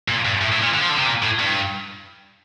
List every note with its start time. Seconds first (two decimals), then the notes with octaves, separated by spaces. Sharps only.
0.08 A#2
0.25 G2
0.42 A2
0.52 A2
0.63 A#2
0.74 D3
0.82 F3
0.90 D3
0.99 C3
1.06 A#2
1.22 A2
1.39 G2